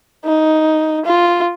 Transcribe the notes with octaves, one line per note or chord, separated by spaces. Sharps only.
D#4
F4